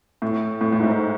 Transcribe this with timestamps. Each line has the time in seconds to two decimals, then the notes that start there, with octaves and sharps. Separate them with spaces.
0.22 A2
0.61 A2
0.72 A2
0.80 G#2